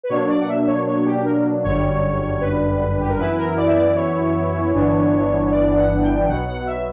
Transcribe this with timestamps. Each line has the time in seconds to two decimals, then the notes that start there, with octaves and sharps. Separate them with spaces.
0.03 B4
0.09 B2 F#3 A#3 D4 C#5
0.28 D5
0.41 F#5
0.48 E5
0.67 C#5
0.87 C#5
1.06 G4
1.25 A#4
1.63 G1 F#2 D3 G3 C#5
2.41 B4
3.01 G4
3.09 A#4
3.18 F#2 E3 B3 E4 B4
3.38 A#4
3.57 D5
3.67 E5
3.76 D5
3.96 C#5
4.73 G1 G2 E3 B3 D4
5.45 C#5
5.51 D5
5.76 F#5
6.02 G5
6.27 B1 B2 F#3 B3 F#5
6.47 F#5
6.67 E5